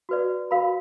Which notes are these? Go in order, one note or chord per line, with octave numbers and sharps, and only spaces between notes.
F#4 B4 D5
F#4 A#4 F5 B5